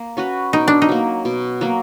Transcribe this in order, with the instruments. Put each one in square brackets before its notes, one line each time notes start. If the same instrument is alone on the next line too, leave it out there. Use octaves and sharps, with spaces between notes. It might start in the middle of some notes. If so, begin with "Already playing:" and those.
Already playing: [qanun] A#3
C#4 F#4 B4
[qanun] B2 [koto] D#4
[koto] D4
D#4
[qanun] F#3 A#3
B2
F#3 A#3